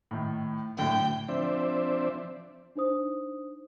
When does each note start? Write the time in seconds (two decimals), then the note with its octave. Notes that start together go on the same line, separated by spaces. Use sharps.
0.11 A2 D#3
0.77 A2 D3 F#3 G5
1.28 F3 C4 D4 C5 D5 E5
2.76 D4 D#4 C5 D#6